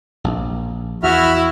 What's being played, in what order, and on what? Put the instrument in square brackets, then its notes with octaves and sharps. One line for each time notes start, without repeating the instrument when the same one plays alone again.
[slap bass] A#1
[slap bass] E2 [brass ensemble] E4 [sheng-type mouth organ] F#4 E5 F6